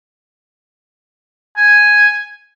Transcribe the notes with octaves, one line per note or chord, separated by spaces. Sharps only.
G#5